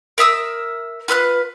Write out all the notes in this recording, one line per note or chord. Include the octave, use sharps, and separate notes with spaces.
A#4 E5 D#6 E6
F4 B4 E6 F#6